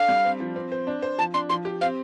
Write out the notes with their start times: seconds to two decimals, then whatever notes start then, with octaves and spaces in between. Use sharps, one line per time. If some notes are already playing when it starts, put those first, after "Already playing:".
Already playing: D4 A4 F5
0.09 G3
0.25 C4
0.40 F3
0.56 C4
0.72 C5
0.87 D4
1.02 C5
1.18 F3 A5
1.34 D4 C6
1.49 F3 C6
1.65 G4
1.81 C4 F5